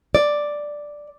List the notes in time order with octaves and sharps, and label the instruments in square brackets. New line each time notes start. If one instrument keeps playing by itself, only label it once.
[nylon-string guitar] D5